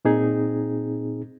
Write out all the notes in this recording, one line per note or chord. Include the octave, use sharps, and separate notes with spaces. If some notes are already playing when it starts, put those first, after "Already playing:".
A#2 C4 D#4 G#4